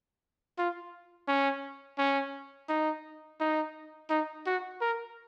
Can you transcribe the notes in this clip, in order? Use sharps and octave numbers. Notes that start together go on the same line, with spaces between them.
F4
C#4
C#4
D#4
D#4
D#4
F#4
A#4